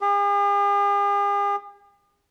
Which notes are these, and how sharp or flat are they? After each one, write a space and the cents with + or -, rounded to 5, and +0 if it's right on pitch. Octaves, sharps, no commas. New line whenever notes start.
G#4 -45